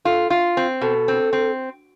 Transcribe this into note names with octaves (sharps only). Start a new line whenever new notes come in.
F4 A4
F4
C4
B2 A4
C4
C4